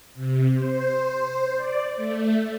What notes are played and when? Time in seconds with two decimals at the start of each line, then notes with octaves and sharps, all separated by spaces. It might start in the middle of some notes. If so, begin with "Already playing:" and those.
0.14 C3
0.53 C5
1.56 D5
1.96 A3